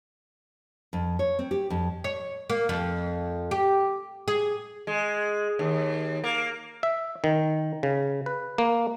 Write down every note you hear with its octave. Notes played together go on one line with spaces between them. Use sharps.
F2
C#5
C4
G4
F2
C#5
A#3
F2
G4
G#4
G#3
D#2
A#3
E5
D#3
C#3
B4
A#3